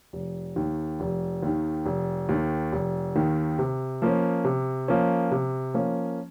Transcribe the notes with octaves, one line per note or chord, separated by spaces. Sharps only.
F1
D#2 D#3
F1
D#2 D#3
F1
D#2 D#3
F1
D#2 D#3
C3
F3 A#3 C#4
C3
F3 A#3 C#4
C3
F3 A#3 C#4